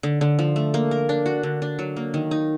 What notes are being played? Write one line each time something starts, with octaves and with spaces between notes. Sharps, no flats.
D3
D3
F3
A3
A#3
A#4
D4
F#4
D3
D4
F#3
A#3
D#3
D#4